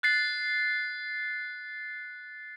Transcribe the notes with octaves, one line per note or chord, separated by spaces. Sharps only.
F#6 A6 C7